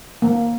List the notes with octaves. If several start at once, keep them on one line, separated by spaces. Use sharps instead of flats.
A#3